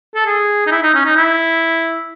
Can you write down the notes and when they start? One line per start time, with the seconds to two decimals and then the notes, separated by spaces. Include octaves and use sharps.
0.15 A4
0.26 G#4
0.67 D#4
0.71 E4
0.83 D#4
0.95 C#4
1.05 D#4
1.16 E4